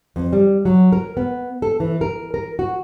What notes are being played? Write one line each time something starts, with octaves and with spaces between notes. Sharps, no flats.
F2
G3
F#3
A#4
B3
A4
E3
A#4
A#4
F#4